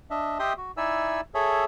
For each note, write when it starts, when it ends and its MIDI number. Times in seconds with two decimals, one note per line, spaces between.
0.10 0.38 62
0.10 0.38 75
0.10 0.38 76
0.39 0.53 67
0.39 0.53 75
0.39 0.53 76
0.39 0.53 79
0.39 0.53 84
0.39 0.53 87
0.57 0.72 66
0.77 1.21 63
0.77 1.21 64
0.77 1.21 74
0.77 1.21 76
0.77 1.21 80
0.77 1.21 88
1.35 1.65 68
1.35 1.65 69
1.35 1.65 73
1.35 1.65 76